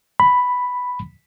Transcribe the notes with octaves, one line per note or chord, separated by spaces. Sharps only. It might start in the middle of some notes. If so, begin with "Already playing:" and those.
B5